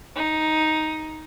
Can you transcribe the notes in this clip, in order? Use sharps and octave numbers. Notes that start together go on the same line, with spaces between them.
D#4